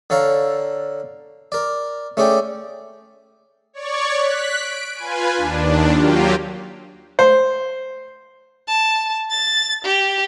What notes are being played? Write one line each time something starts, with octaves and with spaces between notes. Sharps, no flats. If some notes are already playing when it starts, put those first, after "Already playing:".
D3 A4 C#5 F5 A#5
A#4 D5
A3 C#4 G#4 D5 G5
C#5 D5 C#6
F#6 B6
D7
F4 B4 G#5
D#2 D4
F#3 A#3 F4 G4
C5
A5
A6
G4